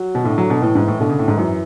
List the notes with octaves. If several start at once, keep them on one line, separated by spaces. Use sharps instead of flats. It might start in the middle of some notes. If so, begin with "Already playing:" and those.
Already playing: F#3
B2
A2 D3
F#3
B2
A2 E3
G#2
A2
B2 D3
C#3
A2
G#2
F#2 E3